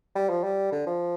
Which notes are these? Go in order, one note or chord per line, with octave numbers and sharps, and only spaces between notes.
G3
F3
G3
D3
F3